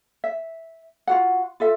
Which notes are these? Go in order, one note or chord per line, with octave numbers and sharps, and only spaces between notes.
E5
F4 F#4 F#5
F4 A4 E5